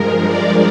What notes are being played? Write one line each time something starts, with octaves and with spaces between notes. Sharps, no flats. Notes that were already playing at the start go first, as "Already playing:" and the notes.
Already playing: G2 F3 G#3 A#4
A#4 D5